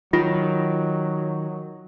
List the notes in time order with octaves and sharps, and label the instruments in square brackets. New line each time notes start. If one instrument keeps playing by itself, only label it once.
[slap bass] D#3 [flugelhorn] F#3 [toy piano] F4